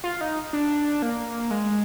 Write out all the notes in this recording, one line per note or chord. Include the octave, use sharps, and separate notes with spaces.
F4
D#4
D4
A#3
G#3